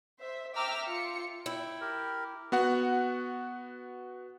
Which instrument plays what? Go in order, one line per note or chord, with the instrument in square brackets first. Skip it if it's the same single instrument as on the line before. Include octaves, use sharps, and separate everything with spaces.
[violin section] C5 E5
E5 G5 A#5 D6 E6 F6
F4 C#7
[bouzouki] E4 [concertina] G5
[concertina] G4 A#4
[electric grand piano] B3 F#4 F#5